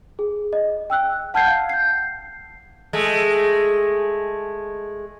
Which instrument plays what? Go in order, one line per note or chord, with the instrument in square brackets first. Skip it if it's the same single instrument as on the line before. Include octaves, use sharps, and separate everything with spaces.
[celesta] G#4
D#5
G5 E6 F#6
F#5 A5 F6 G6 G#6 C7
F5
G6 C7
[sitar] G#3 A3